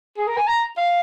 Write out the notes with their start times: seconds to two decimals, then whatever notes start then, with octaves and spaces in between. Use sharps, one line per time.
0.17 G#4
0.27 A#4
0.37 G#5
0.47 A#5
0.78 F5